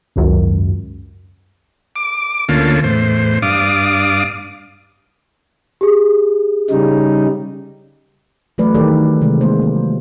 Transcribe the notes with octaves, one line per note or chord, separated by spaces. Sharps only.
G#1 C#2 F#2
D6
D2 D3 A#3 C#4 F4 A5
E2 A2 C5
G2 D4 F5 D6 D#6
G4 G#4
C#3 G3 D#4
E3 F#3 A3 B4 D5
D#3 E3 G4 A4 A#4 D5
C3 E3 G#3
G#3 A#3 C5
F#3